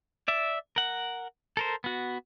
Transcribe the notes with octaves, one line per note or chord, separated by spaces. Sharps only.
D5 E5
A#4 F#5
A4 A#4 C5
B3 F#4